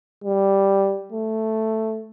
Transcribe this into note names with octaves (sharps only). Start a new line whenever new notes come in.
G3
A3